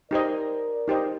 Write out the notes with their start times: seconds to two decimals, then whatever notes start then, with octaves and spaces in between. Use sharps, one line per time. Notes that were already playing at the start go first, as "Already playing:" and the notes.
0.11 D#4 G4 A#4 C5 D5 D#5
0.88 D#4 G4 C5 D#5